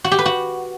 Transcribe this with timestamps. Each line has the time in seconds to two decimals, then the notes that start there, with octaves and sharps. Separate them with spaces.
0.04 F#4
0.12 G4
0.19 B4
0.26 F#4